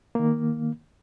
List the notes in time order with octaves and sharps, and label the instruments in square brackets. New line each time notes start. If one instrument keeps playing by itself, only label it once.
[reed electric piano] D#3 A#3